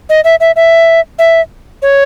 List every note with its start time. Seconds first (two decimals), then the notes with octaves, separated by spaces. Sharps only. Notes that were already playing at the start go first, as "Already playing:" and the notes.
0.09 D#5
0.24 E5
0.40 E5
0.56 E5
1.19 E5
1.82 C#5